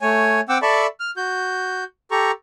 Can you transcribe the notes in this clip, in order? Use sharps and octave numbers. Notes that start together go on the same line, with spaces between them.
A3 C#5 G#5
C4 F#5 G5 D6 E6
A4 D5 E5 A5 B5 C#6
F6
F#4 G6
G4 A4 A#5 C#6